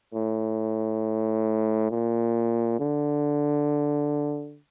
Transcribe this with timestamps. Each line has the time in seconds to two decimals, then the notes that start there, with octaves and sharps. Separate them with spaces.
0.14 A2
1.91 A#2
2.80 D3